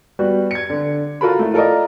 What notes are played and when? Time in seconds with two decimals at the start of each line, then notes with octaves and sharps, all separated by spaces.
0.19 G3 B3 F#4
0.51 G#6 C#7
0.70 D3
1.21 F4 F#4 A4 A#4 B5
1.39 A3 E4
1.54 F4 A4 A#4 D5 D#5